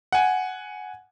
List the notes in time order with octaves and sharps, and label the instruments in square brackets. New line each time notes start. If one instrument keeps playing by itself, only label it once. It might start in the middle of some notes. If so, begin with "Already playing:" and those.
[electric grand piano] F#5 G#5